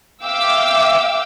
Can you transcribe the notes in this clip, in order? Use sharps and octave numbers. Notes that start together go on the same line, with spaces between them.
E5 F5 G5 D6 E6